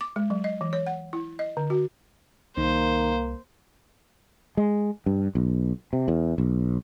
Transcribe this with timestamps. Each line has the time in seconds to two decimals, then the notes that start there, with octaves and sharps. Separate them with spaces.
0.01 D6
0.16 G#3
0.30 F#3
0.44 D#5
0.61 E3
0.73 C#5
0.86 F#5
1.13 E4
1.39 D#5
1.57 D3
1.70 F#4
2.57 C2 D#3 A#3 C5
4.57 G#3
5.06 G2
5.35 B1
5.93 C3
6.08 E2
6.38 B1